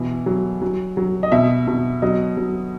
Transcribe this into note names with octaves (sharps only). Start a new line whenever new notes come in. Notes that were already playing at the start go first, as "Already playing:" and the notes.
Already playing: B2 E3
F#3
F#3
F#3
D#5
B2 E5
B2
F#3 D#5
F#3